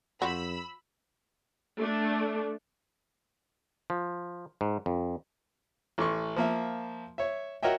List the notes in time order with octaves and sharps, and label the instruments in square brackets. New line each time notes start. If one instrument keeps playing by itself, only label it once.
[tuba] F2 [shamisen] F3 F#4 [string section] B5 E6
[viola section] A3 D4
[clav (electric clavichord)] F3
G#2
F2
[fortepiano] A1 A3 C6 C#6
F3 A#3 E5
C#5 E5
F#4 A#4 C#5 D#5 E5 G5